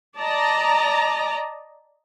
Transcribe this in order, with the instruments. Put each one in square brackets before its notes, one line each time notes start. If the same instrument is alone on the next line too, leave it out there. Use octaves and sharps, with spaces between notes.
[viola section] D5 D#5 A5 A#5